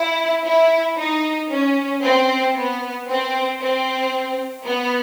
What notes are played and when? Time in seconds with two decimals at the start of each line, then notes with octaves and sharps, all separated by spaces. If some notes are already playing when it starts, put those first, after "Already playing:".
Already playing: E4
0.44 E4
0.97 D#4
1.50 C#4
2.02 C4
2.55 B3
3.08 C4
3.61 C4
4.66 B3